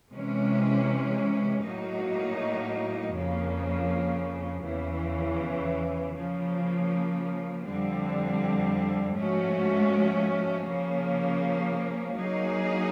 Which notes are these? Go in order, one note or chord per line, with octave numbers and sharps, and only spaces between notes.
C3 E3 G#3 C#4
A2 F#3 A#3 D#4 F#4
F2 C#3 F3 A#3
E2 C#3 E3
C#3 F3 A#3
F2 D3 G3 C4
G#2 F3 A3 C#4 F#4
C#3 F3 A#3 C#4
F#3 A#3 D#4 G#4